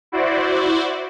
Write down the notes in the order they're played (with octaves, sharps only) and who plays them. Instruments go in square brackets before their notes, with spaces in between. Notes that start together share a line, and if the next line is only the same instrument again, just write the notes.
[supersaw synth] E4 F#4 C5 D5